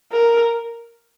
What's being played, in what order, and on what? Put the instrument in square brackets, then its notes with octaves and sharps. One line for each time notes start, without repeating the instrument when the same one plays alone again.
[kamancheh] A#4